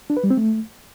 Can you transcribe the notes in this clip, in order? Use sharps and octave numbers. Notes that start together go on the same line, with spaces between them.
D4
B4
G3
C4
A3